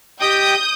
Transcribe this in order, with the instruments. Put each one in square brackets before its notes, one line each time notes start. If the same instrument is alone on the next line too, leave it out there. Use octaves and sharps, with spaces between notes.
[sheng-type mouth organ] G4 D#5 G5 [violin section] D#6 G6